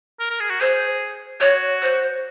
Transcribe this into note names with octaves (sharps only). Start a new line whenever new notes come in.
A#4
A#4
G#4
F#4
G#4 C5
F#4 C#5
C5